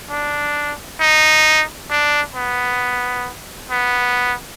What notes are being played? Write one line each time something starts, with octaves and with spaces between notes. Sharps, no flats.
D4
D#4
D4
B3
B3